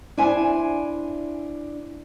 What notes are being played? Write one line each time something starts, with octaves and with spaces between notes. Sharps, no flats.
D4 E4 C5 G#5